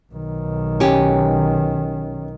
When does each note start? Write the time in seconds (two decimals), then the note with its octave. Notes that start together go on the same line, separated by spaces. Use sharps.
0.13 B1 D#3
0.80 C#4 G4